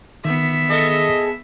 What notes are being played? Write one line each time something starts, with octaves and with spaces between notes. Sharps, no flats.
D#3 B3 E5
G#3 A4 D#5